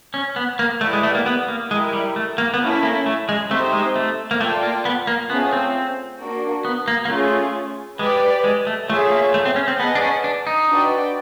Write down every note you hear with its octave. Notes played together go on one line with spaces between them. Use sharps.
C#4
B3
A#3
A3 E4 G4 B4 D5 F#5
G#3
A3
A#3
B3
A#3
G#3 E4 G4 A#4
G3
A3
A#3
B3
A3 A#3 C#4 E4
A#3
A3
G#3
A3 C4 D#4 G4 C5 E5
G#3
A3
A#3
A3 F4 A4 D5 G5
A#3
B3
A#3
A3 B3 C#4 F4 G#4 C5
C4
A#3 D4 F#4
B3
A#3
A#3
A3 C#4 F4 G#4 C#5
G#3 G4 B4 D5
G#3
A3
A3 F4 G#4 C#5 E5
A#3
A3
C4
C#4
C4
B3 G#4 B4 D#5 F#5 A5
D4
C#4
D4
D#4
D4 F#4 B4 D5 G5